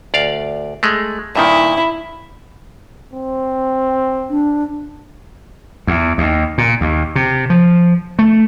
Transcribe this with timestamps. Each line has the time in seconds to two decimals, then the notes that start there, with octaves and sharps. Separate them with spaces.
0.14 D2 D5 F5
0.83 G#3 A3
1.36 G2 A#2 D#3 E4
3.13 C4
4.30 D4
5.87 E2
6.18 D#2
6.58 A#2
6.81 D#2
7.16 C3
7.50 F3
8.19 A3